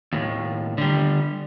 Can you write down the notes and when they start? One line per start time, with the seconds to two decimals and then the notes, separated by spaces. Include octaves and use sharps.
0.13 D#2 A2
0.78 D3 G3